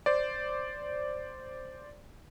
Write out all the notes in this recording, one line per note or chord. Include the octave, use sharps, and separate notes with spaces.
C5 D5